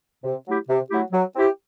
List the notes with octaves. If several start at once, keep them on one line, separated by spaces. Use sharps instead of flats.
C3
F#3 A3 E4 G4
C3
F#3 A3 E4 G4
F#3
C4 E4 G4